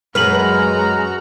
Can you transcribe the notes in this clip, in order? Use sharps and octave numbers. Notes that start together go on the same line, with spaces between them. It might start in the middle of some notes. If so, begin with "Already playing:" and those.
F#2 G#3 F#4 B4 A#5 F6 F#7